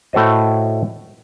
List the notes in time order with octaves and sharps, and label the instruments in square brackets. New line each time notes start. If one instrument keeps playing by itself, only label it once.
[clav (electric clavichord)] A2 A3 F#4 C5 D#5